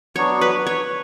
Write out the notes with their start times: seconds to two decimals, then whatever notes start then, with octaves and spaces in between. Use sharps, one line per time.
0.16 F#3 B3 D4 F#4 C#5
0.41 B4
0.67 C#5